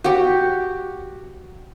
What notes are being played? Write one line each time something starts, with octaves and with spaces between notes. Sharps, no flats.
F#4 G4